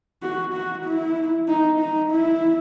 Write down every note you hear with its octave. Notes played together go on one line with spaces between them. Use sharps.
F#4
F#4
E4
D#4
D#4
E4